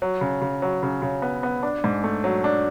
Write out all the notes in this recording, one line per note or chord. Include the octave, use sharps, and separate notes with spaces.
F#3
C#3
C#3
F#3
C#3
C#3
B3
B3
D4
G#2
A3
F#3
D4